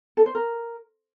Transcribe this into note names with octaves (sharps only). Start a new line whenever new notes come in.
A4
C5
A#4